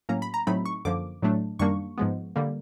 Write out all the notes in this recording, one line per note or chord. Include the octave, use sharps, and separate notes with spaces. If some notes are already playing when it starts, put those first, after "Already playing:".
A2 F#3 A#3 C#4 A#5
B5
A#5
A2 F#3 A3 C4 D#4 B5
C#6
F#2 D3 F3 A#3 D6
A2 F#3 A3 D4
F#2 D#3 G3 A#3 D4 C#6
G#2 F3 G#3 B3
D3 G3 A#3